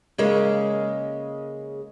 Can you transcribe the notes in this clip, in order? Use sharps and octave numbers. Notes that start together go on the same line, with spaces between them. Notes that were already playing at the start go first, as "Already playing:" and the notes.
C#3 G#3 A#3